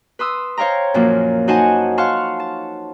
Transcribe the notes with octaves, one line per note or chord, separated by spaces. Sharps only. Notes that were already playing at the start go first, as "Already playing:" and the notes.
B4 C6 D#6 E6
C5 C#5 F5 G5 A#5
F#2 A#2 F3 A#3
D#4 F#4 C5 F#5 G#5 A5
F5 F#5 A5 C6 C#6 F6
A5